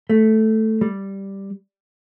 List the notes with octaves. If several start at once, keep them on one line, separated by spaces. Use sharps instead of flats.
A3
G3